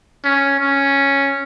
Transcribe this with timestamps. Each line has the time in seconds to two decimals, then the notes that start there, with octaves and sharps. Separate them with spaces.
0.24 C#4
0.60 C#4